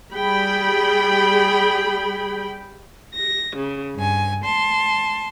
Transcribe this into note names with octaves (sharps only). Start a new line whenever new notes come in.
G3 G#4 G5 B5
A#6
C#3
G2 G#5
A5 C6